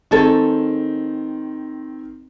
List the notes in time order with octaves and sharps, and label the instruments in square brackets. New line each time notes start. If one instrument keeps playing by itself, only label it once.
[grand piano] D#3 C4 [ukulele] G#4 A4 C#5